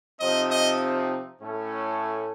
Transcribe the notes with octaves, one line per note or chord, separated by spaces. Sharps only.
C3 F3 C4 D#4 D#5
D#5
A2 A3 C#4